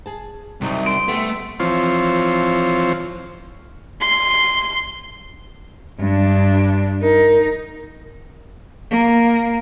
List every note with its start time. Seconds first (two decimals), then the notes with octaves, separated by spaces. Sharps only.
0.06 G#4 A5
0.61 C2 C3 F#3 D#4
0.86 C6 D7
1.08 G3 A3 B3
1.60 E3 F3 C4 F4 C5 C#5
4.00 C6
5.99 G2 D4
7.02 D#4 A#4
8.90 A#3